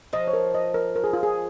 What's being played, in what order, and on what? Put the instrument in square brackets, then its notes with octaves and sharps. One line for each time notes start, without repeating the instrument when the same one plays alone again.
[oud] F3 [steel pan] D#5
[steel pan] C#5
A#4
D#5
A#4
A#4
G#4
F4
G#4